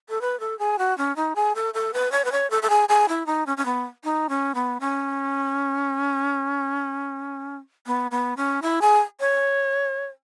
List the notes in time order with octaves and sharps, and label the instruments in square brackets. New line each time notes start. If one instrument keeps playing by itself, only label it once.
[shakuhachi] A4
B4
A4
G#4
F#4
C#4
D#4
G#4
A4
A4
B4
C#5
B4
C#5
A4
A4
G#4
G#4
E4
D#4
C#4
C#4
B3
D#4
C#4
B3
C#4
B3
B3
C#4
E4
G#4
C#5